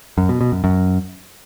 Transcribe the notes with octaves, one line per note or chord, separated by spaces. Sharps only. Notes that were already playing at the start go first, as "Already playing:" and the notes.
F#2
B2
B2
F#2
F#2